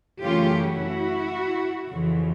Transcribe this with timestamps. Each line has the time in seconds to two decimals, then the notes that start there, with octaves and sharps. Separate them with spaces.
0.23 F#2 C#3 E3 A3 C#4 F4 G4
0.65 E4 F#4
1.91 F2 C#3 E3